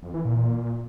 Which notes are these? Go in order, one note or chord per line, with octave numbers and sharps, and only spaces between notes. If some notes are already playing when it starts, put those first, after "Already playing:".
F2
E3
A#2